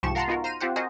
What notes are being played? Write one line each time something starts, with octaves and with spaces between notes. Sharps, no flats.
C2 G#2 F3 G4 C#6 E7
A#4 F5 F#5 A5 A#5 C6
B3 D#4 F4 F#4 A#4
C5 A#5 F6 D#7
C4 F4 G4 C5 F#5
F#4 G#4 A#4 C5 D#5